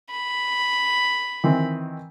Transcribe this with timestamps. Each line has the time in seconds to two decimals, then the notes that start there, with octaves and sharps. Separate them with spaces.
0.11 B5
1.44 D#3 E3 C4